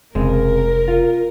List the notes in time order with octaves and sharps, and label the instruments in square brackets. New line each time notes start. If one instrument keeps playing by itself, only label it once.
[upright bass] F1 [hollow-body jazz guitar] C#3 G#3 C4 [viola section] A#4
[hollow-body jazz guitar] F4